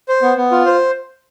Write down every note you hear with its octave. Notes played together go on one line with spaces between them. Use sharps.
C5
B3
B3
F4
C5